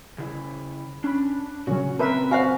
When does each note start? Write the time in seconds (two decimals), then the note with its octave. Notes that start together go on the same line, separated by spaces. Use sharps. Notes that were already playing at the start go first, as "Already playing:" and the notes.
0.18 C#3 E4
1.04 C#4 D4 B5
1.67 A#2 C#3 F#3 C#4 F#4
1.99 C4 A#4 B4 E5 A5 A#5
2.31 F#4 C5 E5 F5 G#5